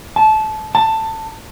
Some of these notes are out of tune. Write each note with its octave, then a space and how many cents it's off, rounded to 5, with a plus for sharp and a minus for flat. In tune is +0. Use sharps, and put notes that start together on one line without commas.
A5 -20
A5 +15